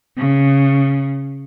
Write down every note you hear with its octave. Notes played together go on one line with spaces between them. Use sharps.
C#3